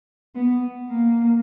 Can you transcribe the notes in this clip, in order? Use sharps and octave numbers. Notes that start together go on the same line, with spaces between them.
B3
A#3